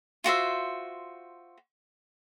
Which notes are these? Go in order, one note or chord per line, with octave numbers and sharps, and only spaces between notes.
F4 F#4 C5 E5